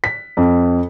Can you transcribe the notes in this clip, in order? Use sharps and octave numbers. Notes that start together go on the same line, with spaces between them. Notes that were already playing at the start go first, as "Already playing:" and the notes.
B6
F2